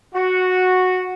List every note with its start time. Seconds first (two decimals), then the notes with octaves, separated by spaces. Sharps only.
0.14 F#4